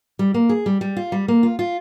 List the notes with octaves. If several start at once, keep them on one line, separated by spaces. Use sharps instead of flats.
G3
A#3
G#4
G3
G3
F4
G3
A#3
F4
F4